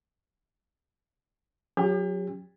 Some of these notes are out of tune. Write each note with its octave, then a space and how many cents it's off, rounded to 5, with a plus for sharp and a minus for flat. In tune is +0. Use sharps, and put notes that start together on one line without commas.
F#3 -20 C#4 +0 G4 +40